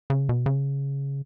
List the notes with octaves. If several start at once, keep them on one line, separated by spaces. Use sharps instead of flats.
C#3
B2
C#3